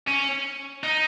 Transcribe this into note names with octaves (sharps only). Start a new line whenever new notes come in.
C#4
D#4